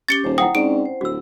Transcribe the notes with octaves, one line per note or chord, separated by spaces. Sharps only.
C#4 G4 D6 A6 C#7 G7
D#1 C5
E4 F#5 G5 D#6
G#2 C4 C#4 D5 D7
C5
D1 F#4 E6